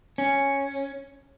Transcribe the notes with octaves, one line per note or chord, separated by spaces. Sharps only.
C#4